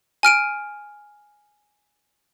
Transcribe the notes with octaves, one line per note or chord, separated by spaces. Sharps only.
G#5 F6 D7 D#7